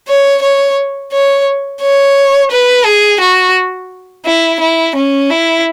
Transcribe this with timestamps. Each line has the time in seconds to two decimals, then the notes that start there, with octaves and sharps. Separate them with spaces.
0.08 C#5
0.42 C#5
1.12 C#5
1.81 C#5
2.51 B4
2.85 G#4
3.20 F#4
4.25 E4
4.60 E4
4.95 C#4
5.30 E4